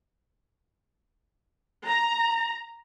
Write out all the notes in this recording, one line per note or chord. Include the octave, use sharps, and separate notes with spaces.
A#5